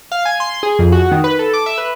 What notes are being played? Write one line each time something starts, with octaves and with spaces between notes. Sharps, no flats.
F5
G#5
C6
G#4
F2
F#4
D#3
B4
A4
D6
E5
B4